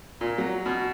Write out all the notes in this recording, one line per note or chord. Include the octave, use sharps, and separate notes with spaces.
A#2
F#3
B2